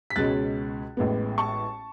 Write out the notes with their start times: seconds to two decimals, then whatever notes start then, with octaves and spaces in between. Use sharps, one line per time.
0.10 B6
0.16 C#2 B2 G#3 C#4 F#6 A6
0.97 A1 A2 G#3 B3
1.38 A5 C#6